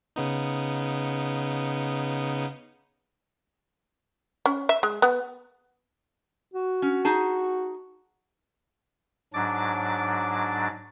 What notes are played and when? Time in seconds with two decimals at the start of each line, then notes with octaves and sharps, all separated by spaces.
0.16 C#3 B3 D#4
4.46 C#4
4.69 E5
4.83 G#3
5.02 B3
6.54 F#4
6.82 C#4
7.05 D#4 G#4 A5
9.34 G#2 F#3 D4 D6 A6